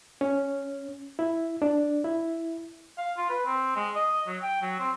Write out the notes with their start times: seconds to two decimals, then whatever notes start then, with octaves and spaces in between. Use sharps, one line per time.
0.21 C#4
1.19 E4
1.62 D4
2.04 E4
2.98 F5
3.17 F4
3.29 B4
3.46 C4
3.76 G#3
3.96 D#5
4.27 F#3
4.42 G5
4.62 F#3
4.80 C4